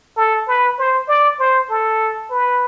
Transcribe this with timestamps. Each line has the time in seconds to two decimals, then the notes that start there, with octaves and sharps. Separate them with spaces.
0.17 A4
0.48 B4
0.79 C5
1.08 D5
1.39 C5
1.70 A4
2.31 B4